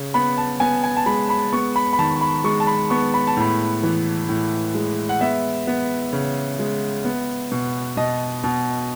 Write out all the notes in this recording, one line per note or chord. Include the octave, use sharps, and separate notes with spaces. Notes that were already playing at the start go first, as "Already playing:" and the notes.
Already playing: C#3
B3 B5
A5
B3 G#5
G#5
A5
G#3 B5
B5
B3 C#6
B5
B5
D#3 A5
B5
G#3 C#6
A5
B5
B3 C#6
B5
A5
A2 B5
E3
A2
G#3
F#5
B3 E5
B3
C#3
G#3
B3
B2
B2 D#5
B2